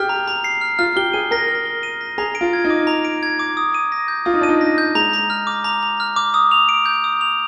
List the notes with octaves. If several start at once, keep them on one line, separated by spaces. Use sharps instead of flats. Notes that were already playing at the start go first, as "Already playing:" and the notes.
Already playing: G4 G#4 F6
A#5
A#5
C7
F6
F4 F6
G4 G7
G#4 D#7
A#4 A#6
F6
G7
D#7
A#6
G#4 A#5
D7
F4
G#6
D#4
D6
A#5
D7
G#6
D6
D#6
D#7
A#6
G6
F4 D#6
D#4
D4 D#7
D#4
A#6
G6
G#3 A#5
A#5
F6
D6
A#5
A#5
F6
D6
D#6
F7
D7
G6
D#6
F7